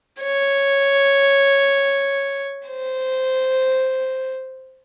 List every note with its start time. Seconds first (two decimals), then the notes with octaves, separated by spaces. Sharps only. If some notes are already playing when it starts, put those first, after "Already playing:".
0.22 C#5
2.67 C5